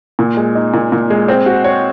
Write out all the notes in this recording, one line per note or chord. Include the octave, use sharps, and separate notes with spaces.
A#2
G#3
D#4
A#2
A#2
G#3
C4
F#4
C#5